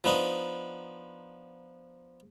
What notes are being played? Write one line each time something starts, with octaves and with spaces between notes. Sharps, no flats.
F3 B3 D4 D#4